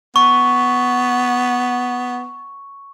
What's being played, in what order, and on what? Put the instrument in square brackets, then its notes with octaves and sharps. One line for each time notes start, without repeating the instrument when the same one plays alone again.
[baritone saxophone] B3 [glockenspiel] C#6